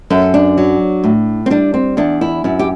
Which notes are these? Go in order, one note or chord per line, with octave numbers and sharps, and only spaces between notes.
F#2 A4
D4
F#3
A2
C4
G3 D4
C4
E2 D4
E4
F#2 E4
G4